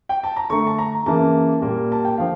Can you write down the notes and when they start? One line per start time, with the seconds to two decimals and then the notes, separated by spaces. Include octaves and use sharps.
0.09 G5
0.23 A5
0.36 A#5
0.50 D3 A3 C#6
0.67 A5
0.78 A#5
1.06 C#3 E3 A#3 A5
1.61 A#2 G3 A#3
1.92 A5
2.05 G5
2.18 D3 F3 F5